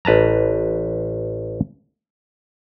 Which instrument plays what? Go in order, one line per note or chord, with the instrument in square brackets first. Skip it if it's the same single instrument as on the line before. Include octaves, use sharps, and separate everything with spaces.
[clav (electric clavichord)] A1 B4 A5 A#5